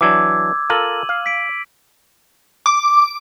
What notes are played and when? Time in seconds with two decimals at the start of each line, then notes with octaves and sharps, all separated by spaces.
0.01 E3 F#3 D4 D6 E6 G#6
0.70 F4 A4 A#4 D#7 F#7
1.09 F5
1.26 B6 D7
2.66 D6